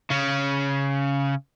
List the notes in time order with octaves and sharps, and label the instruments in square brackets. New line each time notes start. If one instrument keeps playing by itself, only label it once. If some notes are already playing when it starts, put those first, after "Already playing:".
[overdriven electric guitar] C#3 C#4